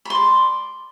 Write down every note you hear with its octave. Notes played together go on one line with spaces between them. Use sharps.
D5 B5 C6